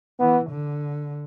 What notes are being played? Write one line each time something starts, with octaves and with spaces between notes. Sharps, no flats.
E3 B3
D3